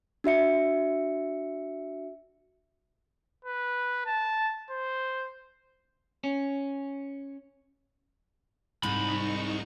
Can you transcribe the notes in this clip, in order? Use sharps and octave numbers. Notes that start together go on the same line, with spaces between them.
D4 F#4 E5 C#7
B4
A5
C5
C#4
C2 G#2 D#4 B5 C#6